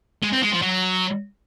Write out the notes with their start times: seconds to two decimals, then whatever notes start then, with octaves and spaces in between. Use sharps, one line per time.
0.23 G#3
0.32 C4
0.42 G#3
0.52 F3
0.62 F#3